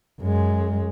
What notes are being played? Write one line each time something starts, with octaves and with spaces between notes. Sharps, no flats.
F#2 G#3